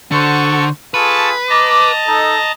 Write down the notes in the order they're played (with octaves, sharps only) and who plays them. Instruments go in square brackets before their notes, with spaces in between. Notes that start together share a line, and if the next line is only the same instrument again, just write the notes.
[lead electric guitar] D3 [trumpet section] F#4 C5 [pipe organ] A4 C#6
[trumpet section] F4 G#4 A4 [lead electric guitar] B4 [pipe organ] A5 C#6
[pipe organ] D#5 A5 A#5 [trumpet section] D6
[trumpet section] D#4 A4